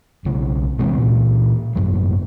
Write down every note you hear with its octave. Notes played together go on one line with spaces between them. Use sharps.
B1 C#3
C3 E3 G#3 C4
A#2 E3
G#1 F#2 F#3